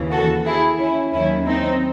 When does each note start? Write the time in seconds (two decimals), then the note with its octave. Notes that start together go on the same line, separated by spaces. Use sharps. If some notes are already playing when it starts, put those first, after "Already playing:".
Already playing: D#2 C#3 E3
0.12 F#4 A4
0.45 E4 G#4
0.79 C#4 E4
1.13 D#2 D#3 F#3 C#4 E4
1.47 C4 D#4